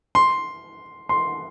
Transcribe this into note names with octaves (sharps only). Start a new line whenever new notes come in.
C6
C6